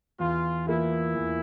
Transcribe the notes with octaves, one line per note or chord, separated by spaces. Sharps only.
E2 F4
E3 A#3 E4 F4
E2